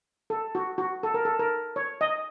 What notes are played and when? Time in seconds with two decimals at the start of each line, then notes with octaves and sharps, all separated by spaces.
0.30 A4
0.55 F#4
0.78 F#4
1.03 A4
1.14 A#4
1.25 A4
1.39 A#4
1.76 C#5
2.01 D#5